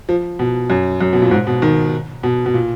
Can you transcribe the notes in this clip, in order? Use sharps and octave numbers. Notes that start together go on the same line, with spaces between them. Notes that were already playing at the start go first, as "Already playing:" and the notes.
F3
B2
F#2
F#2
B2
A#2
G#2
B2
D#3
B2
B2
A#2